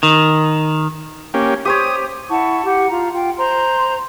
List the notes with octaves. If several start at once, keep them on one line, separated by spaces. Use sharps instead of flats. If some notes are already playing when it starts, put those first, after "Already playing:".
D#3
A#3 C#4 G4
G4 C5 C#5 D#6
E4 F#5 A5 C#6
G4 F#5
F4 A#5
F4 G5
C5 A#5 C6